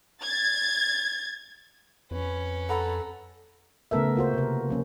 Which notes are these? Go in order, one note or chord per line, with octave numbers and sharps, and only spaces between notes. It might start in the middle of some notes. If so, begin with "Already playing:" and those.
G#6 A6
F2 C#4 B4
A4 F#5 A#5 B5
C#3 A3 B3 A4 A#4 E5
A#3 F4 F#4 C5
C3 A#4
F3 A#3 C#4